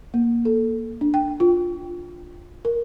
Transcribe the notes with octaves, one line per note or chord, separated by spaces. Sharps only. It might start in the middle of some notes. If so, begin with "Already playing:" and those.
A#3
A4
D4
G5
F4
A#4